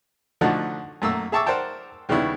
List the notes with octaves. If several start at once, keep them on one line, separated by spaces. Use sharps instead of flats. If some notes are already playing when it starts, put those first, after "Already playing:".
D3 F3 A3 D4 D#4 F#4
F#2 A3 A#3 E6
G#4 E5 A5 C#6 D6 E6
A#4 C5 D5 F#5 G5 A5
D#2 C#3 G3 B3 D4 E4